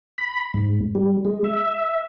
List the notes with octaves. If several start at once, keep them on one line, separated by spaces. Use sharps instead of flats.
B5
G#2
G3
G#3
E5